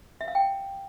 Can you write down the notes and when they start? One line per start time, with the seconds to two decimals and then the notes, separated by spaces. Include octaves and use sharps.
0.21 E5
0.28 F5
0.35 G5